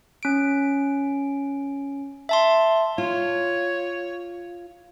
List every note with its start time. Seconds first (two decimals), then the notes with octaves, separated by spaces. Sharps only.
0.23 C#4 D7
2.29 E5 A5 C6
2.98 F4 C#5